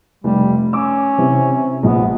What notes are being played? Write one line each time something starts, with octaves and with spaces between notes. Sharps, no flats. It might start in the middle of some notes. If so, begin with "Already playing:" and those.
F1 G3
C#4 D6 E6
C3 E3
A#1 G#3 B3